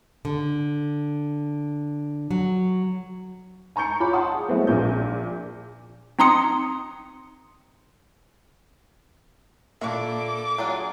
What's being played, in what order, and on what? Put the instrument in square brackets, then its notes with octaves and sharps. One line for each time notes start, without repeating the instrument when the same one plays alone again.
[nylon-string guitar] D3
F#3
[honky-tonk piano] G#5 A#5 C#6 G6 C#7
F4 C#5 B5 D6
F#5 A5 C6 D#6
G#4
F#3 G#3 A3 B3 C4 E4
A#1 A#2 G6
[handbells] C4 D#4 A#5 C6 D#6 C#7
[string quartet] A#2 A4 [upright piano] A#3 [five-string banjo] D4 E4 [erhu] D6
[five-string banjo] F#3 D4 F4 [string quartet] G#4